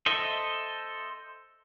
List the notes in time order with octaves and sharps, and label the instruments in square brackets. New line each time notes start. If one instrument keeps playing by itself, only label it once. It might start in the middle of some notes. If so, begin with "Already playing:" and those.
[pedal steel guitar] A4 C5 D#5 E5